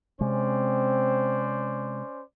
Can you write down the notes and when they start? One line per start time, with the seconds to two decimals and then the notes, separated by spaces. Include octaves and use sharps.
0.21 C3 G#3 C4 C#4 C5 D5